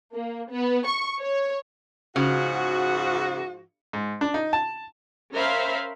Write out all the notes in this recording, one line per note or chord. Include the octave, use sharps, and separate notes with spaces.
A#3
B3
C#6
C#5
G#2 C#3 F3 F#4
G#2
D4
D#4
A5
C#4 A#4 C5 E5 F5 B5